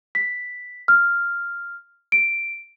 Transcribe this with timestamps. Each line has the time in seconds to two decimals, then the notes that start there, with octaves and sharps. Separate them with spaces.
0.15 B6
0.88 F6
2.12 D7